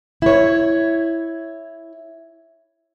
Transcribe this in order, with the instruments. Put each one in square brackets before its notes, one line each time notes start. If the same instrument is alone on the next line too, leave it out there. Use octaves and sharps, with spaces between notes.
[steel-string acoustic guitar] E4 C#5